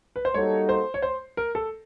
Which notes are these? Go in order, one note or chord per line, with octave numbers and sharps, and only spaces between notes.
B4
C5
G3 A#3 D#4 F#4 A4 C#5
C5
C#5
C5
A#4
A4